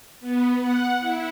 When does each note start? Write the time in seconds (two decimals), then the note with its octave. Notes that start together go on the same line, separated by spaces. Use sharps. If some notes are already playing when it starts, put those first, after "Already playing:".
0.20 B3
0.59 F#5
1.00 E4